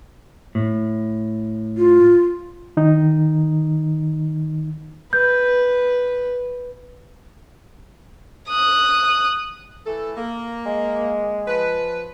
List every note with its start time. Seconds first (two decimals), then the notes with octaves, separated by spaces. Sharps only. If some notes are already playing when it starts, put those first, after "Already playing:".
0.55 A2
1.77 F4
2.77 D#3 D#4
5.13 B4 G6
8.49 D#6 F#6
9.86 E3 A3 A4
10.17 A#3
10.66 G#3
11.48 F3 B4